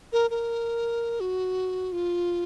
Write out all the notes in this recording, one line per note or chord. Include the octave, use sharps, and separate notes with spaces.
A#4
A#4
F#4
F4